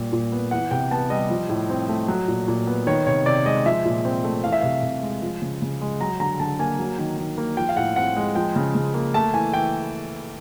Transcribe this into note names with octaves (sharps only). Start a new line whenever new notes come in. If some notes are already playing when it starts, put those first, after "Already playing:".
Already playing: A#2 G3
A#2
B3
E3 F#5
C3 G5
B3 A5
G3 D#5
F3
A2
C4
A3
F#3
A#2
A#2
B3
D#3 C#5
C3 C#5
C3 D5
G#3 D#5
F3 E5
A#2
C4
A3
E3 F5
E5
C3 F5
C3
G#3
F3
C#3
C#3
G#3
F#3 A#5
D3 A#5
D3 A5
A#3 G#5
F#3
D#3
D#3
A#3
F3 G5
F5
A2 F#5
C4 F#5
G#3
F3 G5
C#3
C#3
A#3
A3 A5
E3 G#5
E3 G5